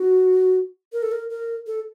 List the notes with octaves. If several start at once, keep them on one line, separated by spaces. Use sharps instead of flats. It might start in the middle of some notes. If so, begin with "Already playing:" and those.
Already playing: F#4
A#4
A4
A#4
A#4
A4